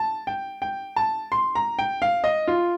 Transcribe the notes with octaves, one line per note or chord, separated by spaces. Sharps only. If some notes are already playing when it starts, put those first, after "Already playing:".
Already playing: A5
G5
G5
A5
C6
A#5
G5
F5
D#5
F4